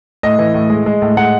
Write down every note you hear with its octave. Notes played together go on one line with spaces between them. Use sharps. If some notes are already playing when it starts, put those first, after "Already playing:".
A2 D#5
E3
A2
G#3
G#3
A2
G#3 F#5